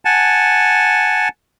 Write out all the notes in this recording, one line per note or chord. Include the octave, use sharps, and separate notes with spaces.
F#5 G#5 A5